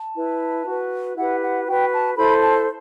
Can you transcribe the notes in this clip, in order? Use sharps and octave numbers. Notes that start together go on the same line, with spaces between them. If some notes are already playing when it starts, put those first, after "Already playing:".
Already playing: A5
E4 B4
F#4 B4
E4 G4 B4 F#5
F#5
F#4 B4 G5
A5
E4 A4 C5 B5
A5